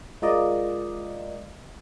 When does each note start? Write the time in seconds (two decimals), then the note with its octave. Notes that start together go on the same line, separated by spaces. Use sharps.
0.22 G#3 F4 A#4 D5 D#5